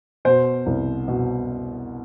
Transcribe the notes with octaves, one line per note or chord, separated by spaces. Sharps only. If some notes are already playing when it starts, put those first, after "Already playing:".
B2 C5
C2
B2